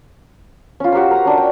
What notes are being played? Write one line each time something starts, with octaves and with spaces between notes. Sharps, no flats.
C#4 F4
F#4 G4 A#4 C5
A#4 A#5
C#4 D4 F#5
G5